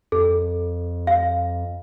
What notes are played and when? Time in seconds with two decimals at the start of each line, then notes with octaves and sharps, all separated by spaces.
0.12 F2 A4
1.07 F5